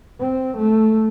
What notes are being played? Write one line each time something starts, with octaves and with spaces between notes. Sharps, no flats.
C4
A3